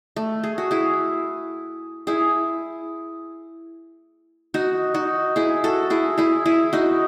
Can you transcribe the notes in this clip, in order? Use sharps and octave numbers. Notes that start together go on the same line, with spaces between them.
A3
G#4
F#4
E4 G#4
E4 G#4
D#4 F#4
D#4 F#4
E4 G#4
F#4 A4
E4 G#4
E4 G#4
E4 G#4
D#4 F#4